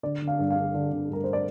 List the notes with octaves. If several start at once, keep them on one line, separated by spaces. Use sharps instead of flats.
D3 D5
D3
F5
G2
F5
D3
D3
D3
G2 A#4
C5
D5